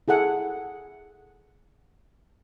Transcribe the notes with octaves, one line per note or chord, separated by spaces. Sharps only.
E4 G#4 A4 F#5 G#5